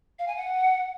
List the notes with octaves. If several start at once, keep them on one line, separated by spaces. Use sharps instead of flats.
F5
G#5
F#5